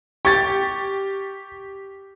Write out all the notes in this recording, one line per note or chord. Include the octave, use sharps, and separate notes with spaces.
G4 C#6 A6